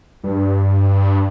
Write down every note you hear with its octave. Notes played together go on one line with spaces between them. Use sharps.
G2